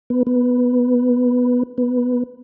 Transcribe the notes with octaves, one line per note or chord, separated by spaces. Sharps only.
B3
B3
B3